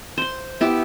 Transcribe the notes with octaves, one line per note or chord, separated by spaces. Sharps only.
C5 C6
B3 E4 G4